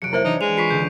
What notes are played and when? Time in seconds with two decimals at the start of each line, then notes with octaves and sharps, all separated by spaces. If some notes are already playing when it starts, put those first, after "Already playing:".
0.02 F1 F#3 F#6 C#7 D7
0.13 A#3 E4 C5 E5
0.25 E3 D4 D#4 G#6
0.41 G#3 D#7 F7
0.57 F4 C#6 B6 C7
0.70 C#2 D3 G6